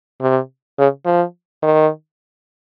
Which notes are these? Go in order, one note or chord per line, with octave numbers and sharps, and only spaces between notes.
C3
C#3
F3
D#3